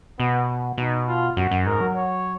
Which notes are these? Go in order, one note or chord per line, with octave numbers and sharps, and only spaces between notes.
B2 B3
B2 D#4
F4
F#2 F#4
F#2
G#2 A#4
F#3
C#5